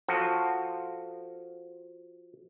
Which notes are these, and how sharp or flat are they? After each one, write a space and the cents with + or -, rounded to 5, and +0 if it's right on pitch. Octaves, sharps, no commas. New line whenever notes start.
F3 +0 F#4 +0 A4 +15